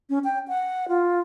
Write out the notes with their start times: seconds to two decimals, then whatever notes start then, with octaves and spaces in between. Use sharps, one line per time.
0.10 C#4
0.24 G5
0.48 F#5
0.89 F4